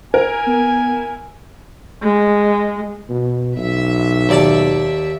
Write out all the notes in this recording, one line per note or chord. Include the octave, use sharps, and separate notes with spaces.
E4 A#4 G#5
B3
G#3
B2
B1 E5
D#2 D5 A5